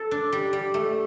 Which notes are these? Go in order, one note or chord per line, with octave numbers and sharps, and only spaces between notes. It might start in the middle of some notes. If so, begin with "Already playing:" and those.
Already playing: A4
D4
G3
G3
A3